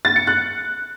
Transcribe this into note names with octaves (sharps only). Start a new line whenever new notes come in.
A6
C#7
F#6